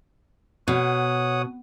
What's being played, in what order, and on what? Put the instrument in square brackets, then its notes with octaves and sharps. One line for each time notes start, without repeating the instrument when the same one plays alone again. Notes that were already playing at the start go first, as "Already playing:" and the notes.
[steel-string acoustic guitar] B2 [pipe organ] C#5 F#5 D#6